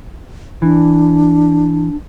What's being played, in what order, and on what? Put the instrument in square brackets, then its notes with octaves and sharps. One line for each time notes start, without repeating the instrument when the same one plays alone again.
[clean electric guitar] E3 [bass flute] D4